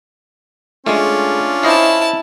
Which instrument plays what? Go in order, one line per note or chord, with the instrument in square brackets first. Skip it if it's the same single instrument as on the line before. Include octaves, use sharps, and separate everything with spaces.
[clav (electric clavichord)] G#3 A3 [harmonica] C#4 [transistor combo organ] D4 F4
[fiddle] E4 A5 [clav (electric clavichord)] C5 D#5 F5